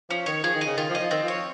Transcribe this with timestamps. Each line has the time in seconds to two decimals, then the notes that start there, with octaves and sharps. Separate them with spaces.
0.10 F3 C#4
0.26 D#3 C#5
0.44 F3 G#4
0.55 D#3
0.61 D#5
0.66 C#3
0.77 D#3 F4
0.89 F3
0.95 D#5
1.00 F3
1.11 D#3 C4
1.23 F3
1.28 C#5
1.34 F3